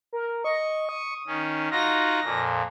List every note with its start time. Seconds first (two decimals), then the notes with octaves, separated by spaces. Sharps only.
0.13 A#4
0.44 D#5 C#6
0.89 D#6
1.27 D#3 C#4
1.71 D#4 F4 F#4 A#6
2.23 F2 A#2